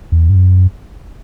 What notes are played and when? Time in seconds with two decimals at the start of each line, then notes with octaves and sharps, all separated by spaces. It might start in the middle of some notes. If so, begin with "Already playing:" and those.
0.12 E2
0.29 G2
0.35 F#2